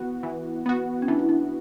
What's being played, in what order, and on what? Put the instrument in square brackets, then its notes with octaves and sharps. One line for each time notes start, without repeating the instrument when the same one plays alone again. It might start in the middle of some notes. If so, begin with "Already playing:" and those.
Already playing: [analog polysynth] E3 B3 F#4
E3
B3 F#4
[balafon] C#4
[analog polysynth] E3 [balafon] D4
[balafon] E4
D4